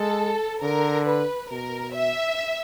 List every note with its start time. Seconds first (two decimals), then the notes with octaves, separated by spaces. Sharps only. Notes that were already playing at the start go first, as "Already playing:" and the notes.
Already playing: G#3 A4
0.61 D3 A#4
1.06 B4
1.51 B2 A#4
1.97 E5